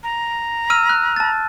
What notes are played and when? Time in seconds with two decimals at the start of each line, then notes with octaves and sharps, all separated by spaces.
0.03 A#5
0.70 E6 F6 D#7
0.89 F#6
1.16 A5 A6